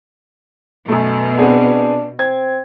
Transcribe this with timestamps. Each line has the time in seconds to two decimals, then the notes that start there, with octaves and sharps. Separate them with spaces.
0.88 F#2 B2 A3
1.39 B3 C4 D4 G#4
2.19 C4 G#6